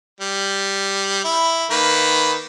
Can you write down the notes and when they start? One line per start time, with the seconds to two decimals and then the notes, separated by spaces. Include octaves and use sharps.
0.20 G3
1.24 E4
1.70 D#3 A#3 B4